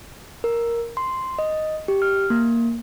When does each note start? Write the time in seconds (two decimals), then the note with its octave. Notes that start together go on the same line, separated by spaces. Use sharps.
0.44 A#4
0.97 C6
1.39 D#5
1.88 G4
2.02 F6
2.30 A#3